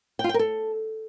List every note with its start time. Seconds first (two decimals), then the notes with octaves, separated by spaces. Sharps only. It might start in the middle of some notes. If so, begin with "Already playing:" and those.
0.19 G5
0.24 F4
0.29 G5
0.34 A#4
0.39 A4